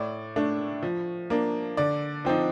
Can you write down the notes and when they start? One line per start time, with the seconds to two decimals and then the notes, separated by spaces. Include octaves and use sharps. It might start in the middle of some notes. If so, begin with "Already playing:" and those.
Already playing: A2 D5
0.36 A3 D4
0.83 F3
1.30 A#3 D4
1.77 D3 D5
2.25 F3 C4 D#4